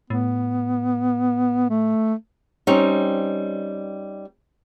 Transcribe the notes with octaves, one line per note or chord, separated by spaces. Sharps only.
A2 B3
A3
G3 C4 C#4 D#4